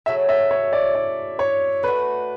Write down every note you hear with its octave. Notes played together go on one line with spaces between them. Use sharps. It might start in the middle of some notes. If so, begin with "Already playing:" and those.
C#3 F#3 A3 E5
E5
C#5
D5
D5
C#5
A3 D4 F#4 B4